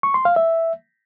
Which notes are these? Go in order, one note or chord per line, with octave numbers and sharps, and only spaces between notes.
C#6
C6
F5
E5